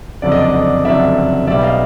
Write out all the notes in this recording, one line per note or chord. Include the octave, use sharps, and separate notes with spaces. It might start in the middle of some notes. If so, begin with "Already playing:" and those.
F#1 F2 D3 F#3 D5
D#5
D5
D#5
D5
F#1 F2 D3 F#3 D5 E5
B1 B2 G3 D5 E5
D#5 F5